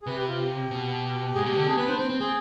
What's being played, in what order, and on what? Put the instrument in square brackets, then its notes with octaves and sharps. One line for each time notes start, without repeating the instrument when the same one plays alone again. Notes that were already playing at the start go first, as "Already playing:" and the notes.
[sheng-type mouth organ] G#4
[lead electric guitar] C3 [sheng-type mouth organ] B4
[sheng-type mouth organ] G4
F4
G4
[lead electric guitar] B2
[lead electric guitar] G#2 [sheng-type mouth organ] G#4
[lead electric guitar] B2 [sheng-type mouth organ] G4
[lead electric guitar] D3 [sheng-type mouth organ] G4
[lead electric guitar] C4 [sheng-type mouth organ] G#4
[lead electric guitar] B3 [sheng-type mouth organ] B4
[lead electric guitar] D4 [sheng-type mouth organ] C5
[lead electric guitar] C4 [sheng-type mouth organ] C5
[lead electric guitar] C4
[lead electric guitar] C4 [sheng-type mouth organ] G#4